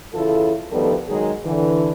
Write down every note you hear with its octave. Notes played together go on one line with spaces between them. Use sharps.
C#3 E3 E4 F4 A4
D2 D#3 F3 G3 B3 A4
D#3 F#3 G#3 G#4
D3 E3